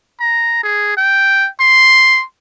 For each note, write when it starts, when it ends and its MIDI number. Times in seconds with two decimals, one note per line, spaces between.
0.20 0.61 82
0.63 0.96 68
0.97 1.49 79
1.60 2.24 84